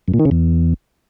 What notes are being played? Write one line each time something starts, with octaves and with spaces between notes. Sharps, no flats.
F#2
A#2
D#3
C#3
E2